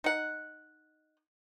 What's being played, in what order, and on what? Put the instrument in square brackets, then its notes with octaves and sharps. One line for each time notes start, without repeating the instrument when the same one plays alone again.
[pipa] D#4 F#5